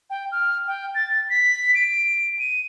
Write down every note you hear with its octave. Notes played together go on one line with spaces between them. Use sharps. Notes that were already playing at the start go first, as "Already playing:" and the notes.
G5
F6
G5
A6
B6
D7
D#7